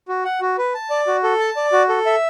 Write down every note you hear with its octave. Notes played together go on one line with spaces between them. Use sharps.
F#4
F#5
F#4
B4
A5
D5
F#4
A4
A5
D5
F#4
A4
E5